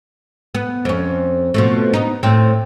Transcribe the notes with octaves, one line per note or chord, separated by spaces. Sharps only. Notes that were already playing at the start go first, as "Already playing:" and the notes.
B3
F2 C#4
B2 F3 A3
B3 D#4
A2 C4